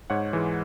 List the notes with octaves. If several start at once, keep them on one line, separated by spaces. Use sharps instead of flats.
G#2 C#5 F#5
E3 G#3